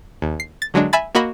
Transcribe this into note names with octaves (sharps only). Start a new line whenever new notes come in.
D#2
C7
A6
D3 F#3 G#3 D4
E5 G#5 B5 A6
A#3 F#4 D#5 B5